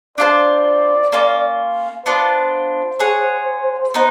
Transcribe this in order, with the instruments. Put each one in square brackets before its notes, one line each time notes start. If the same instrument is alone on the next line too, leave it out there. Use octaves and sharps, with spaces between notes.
[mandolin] D4 F4 A4 C5 [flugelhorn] D5
[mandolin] A#3 C#4 F4
[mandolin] B3 D4 F4 [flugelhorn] C5
[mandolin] G#4 C#5 F#5
B3 D#4